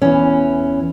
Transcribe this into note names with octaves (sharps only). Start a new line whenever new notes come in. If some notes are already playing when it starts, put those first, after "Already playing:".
E2 E3 C#4